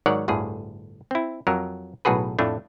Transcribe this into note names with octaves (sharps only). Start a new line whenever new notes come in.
G#2 D#3 F#3 C#5 D5 F#5
G1 D2 A2 G#4
C4 E4
F2 F#3 A#4
B1 A2 F#4 G#4 B4
F2 A2 A3 D4